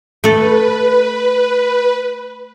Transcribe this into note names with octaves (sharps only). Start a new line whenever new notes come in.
A3 A4 B4